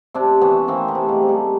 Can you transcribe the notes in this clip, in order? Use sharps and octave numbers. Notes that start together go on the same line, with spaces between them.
C3 C4 D4
E3 B3 C#4
E3 A#3 C4
A3 B3
C3
G#3 A#3
C3
G3 A3